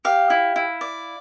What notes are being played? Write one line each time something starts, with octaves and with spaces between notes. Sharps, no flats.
G4 F5
E4
E4
D5